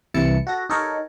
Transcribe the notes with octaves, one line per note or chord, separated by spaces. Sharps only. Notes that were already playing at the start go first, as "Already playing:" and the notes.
C2 E3 E4 A5 C#7
F#4 A4 A#6
D#4 G4 A4 A#4 C#5